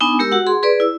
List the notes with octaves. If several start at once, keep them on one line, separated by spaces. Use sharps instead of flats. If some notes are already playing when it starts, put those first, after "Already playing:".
B3 D4 D#4 G#5
G#3 G4 A#4 E6
F#4 F#5
G#4 C6
G#4 B4 D5
E4 E6